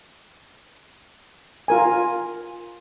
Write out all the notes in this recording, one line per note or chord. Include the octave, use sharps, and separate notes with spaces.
F4 A#4 G#5